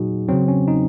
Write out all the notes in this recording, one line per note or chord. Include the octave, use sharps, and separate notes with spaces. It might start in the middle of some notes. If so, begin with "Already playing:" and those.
Already playing: A#2 F#3 D#4 F#4 G#4
C#3 F#3 C4
C#4
D#4